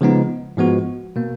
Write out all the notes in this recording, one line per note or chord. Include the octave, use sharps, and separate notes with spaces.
C#3 F3 G#3 B3 D#4
G#2 F3 G#3 B3 F#4
B2 A#3